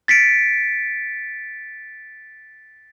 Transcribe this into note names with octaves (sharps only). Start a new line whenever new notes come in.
A6 B6 C#7 D7